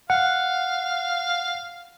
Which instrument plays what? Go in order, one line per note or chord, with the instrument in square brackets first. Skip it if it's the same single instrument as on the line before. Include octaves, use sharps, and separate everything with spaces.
[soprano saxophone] F5 [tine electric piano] F#5